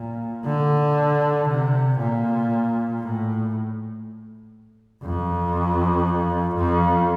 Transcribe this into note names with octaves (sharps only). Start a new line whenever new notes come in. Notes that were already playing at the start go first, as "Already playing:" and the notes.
Already playing: A#2
D3
C3
A#2
A2
F2
F2